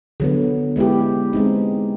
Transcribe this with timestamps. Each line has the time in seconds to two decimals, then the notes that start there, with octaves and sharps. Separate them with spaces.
0.20 D3 F#3 B3
0.76 G#3 B3 E4 G4
1.33 G#3 C4 D#4